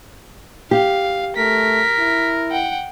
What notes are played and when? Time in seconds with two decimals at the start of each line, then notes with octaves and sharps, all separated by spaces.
0.71 G4 F5
1.37 A3 A#4 B6
1.99 E4
2.51 F#5 G5